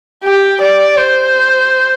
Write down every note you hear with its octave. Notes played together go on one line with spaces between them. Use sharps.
G4
D5
C5